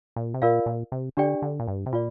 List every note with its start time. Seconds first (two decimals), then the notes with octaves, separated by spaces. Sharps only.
0.16 A#2
0.34 C3
0.42 A#2 F4 A#4 D5 F5
0.66 A#2
0.92 C3
1.17 D3 D4 G4 D5 G5
1.42 D3
1.60 A#2
1.68 G2
1.86 C3
1.93 A#2 F4 D5